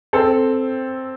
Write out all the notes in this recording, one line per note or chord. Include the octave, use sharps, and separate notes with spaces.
C4 A4